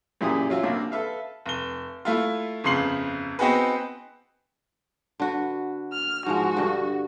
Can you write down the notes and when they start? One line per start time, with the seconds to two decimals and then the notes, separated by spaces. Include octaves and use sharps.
0.21 F#2 A#2 E4 G4 G#4 D#6
0.50 F#3 C#4 F4 F#4 E5
0.63 C2 A#3 D4
0.92 A4 B4 E5 F5
1.46 F1 G7
2.05 A3 E4 F4
2.64 G1 F2 C#3 C6 C7 F#7
3.39 B3 C4 D#4 F#4 G#4 B4
5.20 D3 F#4 B4
5.93 F6
6.26 G#2 F3 G#3 F#4
6.57 G2 D3